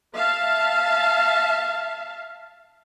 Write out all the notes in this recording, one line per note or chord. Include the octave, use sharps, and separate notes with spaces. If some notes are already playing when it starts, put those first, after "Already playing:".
E5 F5 A5